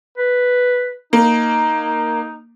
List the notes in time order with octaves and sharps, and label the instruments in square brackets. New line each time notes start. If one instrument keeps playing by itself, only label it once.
[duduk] B4
[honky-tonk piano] A#3 [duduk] D#4